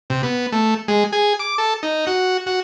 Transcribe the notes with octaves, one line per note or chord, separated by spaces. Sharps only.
C3
B3
A3
G#3
G#4
D6
A4
D#4
F#4
F#4